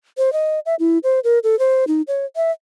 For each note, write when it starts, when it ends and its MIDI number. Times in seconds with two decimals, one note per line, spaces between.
0.18 0.33 72
0.33 0.60 75
0.66 0.75 76
0.79 0.98 64
1.04 1.20 72
1.24 1.39 70
1.44 1.58 69
1.59 1.85 72
1.88 2.02 63
2.08 2.25 73
2.36 2.51 76